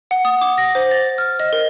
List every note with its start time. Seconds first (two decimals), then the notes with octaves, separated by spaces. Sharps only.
0.11 F#5
0.25 D#6
0.42 D6
0.58 A#6
0.75 C5
0.91 A6
1.18 F6
1.40 D#5
1.53 A#4